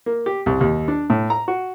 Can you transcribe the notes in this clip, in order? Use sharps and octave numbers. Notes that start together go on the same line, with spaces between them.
A#3
G4
C2
D#2
D4
A2
A#5
F#4